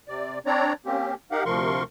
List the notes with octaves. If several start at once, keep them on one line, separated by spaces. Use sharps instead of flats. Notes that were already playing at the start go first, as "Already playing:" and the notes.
C3 D5
C4 D4 C#5 D5 A#5
A#3 C4 C#4 G4
D#4 G4 A#4 F5 F#5
D2 C3 F3 A#4 C6 C#6